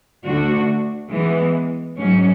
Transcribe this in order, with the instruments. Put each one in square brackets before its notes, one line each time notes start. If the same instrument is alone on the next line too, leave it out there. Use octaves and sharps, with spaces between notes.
[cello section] D2 D3 A3 D4 F#4
E3 G#3 B3
G#2 F#3 C#4